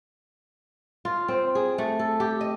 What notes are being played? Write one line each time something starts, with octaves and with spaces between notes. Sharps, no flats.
F4
C4
G#4
A3
A4
G4
D#5